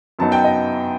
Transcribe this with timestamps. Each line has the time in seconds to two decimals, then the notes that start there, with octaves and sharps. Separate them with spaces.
0.19 F#2 F#3 B3 D#4 A5
0.32 G5
0.44 D#5